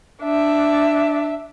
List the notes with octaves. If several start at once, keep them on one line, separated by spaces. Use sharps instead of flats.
D4 E5